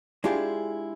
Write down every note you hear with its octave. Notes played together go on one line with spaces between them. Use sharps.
G#3 D4 E4 F4 G4 G#4